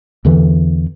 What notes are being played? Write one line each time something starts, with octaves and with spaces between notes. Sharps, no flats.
E2 D3 E3